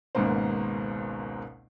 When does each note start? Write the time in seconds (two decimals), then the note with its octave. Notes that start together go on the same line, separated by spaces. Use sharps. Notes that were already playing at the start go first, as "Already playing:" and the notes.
0.15 G#1 C#2 G#2 B2 A#3 C5